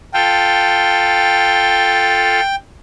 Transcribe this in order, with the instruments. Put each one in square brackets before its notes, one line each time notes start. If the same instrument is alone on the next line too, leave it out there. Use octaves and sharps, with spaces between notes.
[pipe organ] F4 A4 [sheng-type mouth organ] G5